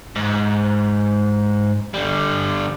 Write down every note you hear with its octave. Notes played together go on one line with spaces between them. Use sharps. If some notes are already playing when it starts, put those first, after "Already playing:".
G#2
D3 G3